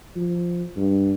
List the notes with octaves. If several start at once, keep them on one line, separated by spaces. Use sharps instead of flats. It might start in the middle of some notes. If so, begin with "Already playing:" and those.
F3
G2